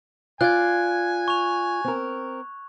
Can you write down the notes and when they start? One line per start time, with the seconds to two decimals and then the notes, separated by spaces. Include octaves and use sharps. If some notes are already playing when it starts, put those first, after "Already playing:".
0.41 F4 D5 G#5 F#6 G#6
1.28 C#6 F7
1.85 C4 A#4